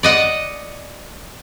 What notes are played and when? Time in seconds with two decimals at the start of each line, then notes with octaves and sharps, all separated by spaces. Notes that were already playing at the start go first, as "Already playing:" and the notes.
0.03 D5 D#5 F#5